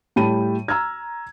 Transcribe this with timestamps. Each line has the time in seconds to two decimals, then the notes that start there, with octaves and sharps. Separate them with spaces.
0.16 A2 G3 G5 A5 B5 D#7
0.68 A#5 E6 F6 G#6